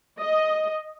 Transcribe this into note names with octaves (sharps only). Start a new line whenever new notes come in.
D#5